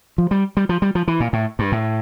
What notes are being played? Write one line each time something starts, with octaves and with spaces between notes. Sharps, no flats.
F3
G3
G3
F3
G3
F3
E3
A#2
A2
G2
A2